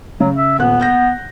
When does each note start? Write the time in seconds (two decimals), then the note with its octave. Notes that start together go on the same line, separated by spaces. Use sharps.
0.20 C#3 F#3
0.35 E5
0.59 D#1 B3 F#6
0.79 F#5 G6 A#6